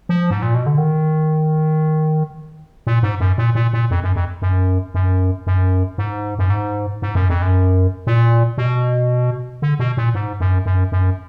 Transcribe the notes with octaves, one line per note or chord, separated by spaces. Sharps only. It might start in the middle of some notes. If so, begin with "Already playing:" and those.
F3
G#2
A#2
B2
D3
D#3
A#2
G#2
F#2
A#2
A#2
A#2
F2
F#2
F2
F#2
F#2
F#2
G#2
F#2
G#2
G#2
F#2
F2
F#2
A#2
B2
D3
B2
A#2
G#2
F#2
F#2
F#2